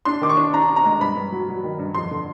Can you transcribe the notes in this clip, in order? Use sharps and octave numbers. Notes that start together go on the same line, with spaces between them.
D4 C6
D#3 D6
C#6
D4
D4 A#5
D4
A#5
G#3
G2 B5
G2
F#3
F#3
D#3
G2
F2 C6
D3